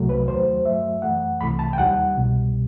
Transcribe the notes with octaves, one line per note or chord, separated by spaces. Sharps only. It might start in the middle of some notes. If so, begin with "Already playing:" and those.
Already playing: C2 C3 F#3 A3
B4
D#2 D#3 F#3 A3 C5
G2 F#3 A3 E5
F#2 E3 A3 F#5
C2 C3 E3 A3 B5
A5
G5
D#2 D#3 G3 F#5
C2 B2 G3